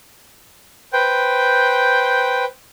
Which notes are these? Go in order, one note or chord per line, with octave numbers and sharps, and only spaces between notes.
B4 C5 G5